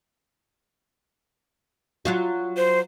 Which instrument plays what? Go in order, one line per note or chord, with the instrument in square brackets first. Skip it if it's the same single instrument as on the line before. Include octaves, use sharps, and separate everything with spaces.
[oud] F#3 F4 F#4
[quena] C5